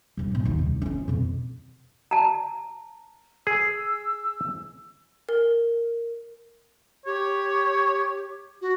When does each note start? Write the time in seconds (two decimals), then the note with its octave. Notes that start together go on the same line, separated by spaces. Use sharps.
0.17 E1 F#2
0.31 G#2 B2
0.45 D#2
0.59 C2
0.82 C#4 F4
1.08 F2 B2
2.11 A5 A#5
3.47 G#4 E6
5.29 A#4
7.06 G4 C#5
8.61 F#4